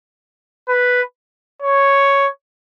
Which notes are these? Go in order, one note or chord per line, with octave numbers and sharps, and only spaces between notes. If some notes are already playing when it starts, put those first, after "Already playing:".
B4
C#5